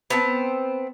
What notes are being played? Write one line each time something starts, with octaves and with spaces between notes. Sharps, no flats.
B3 C4 A5